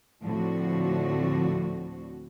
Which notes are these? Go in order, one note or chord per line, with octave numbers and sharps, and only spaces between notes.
D2 A2 D3 F3 C4 F#4